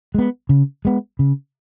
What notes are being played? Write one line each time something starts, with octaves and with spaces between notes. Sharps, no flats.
G#3 B3
C#3
G#3 B3
C#3